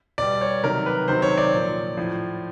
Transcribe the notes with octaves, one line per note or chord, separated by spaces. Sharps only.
B2 G3 D5
C#5
C3 D#3 F#3 A#4
B4
C3 D#3 F#3 C5
C#5
D5
A#2 F3
A2 F3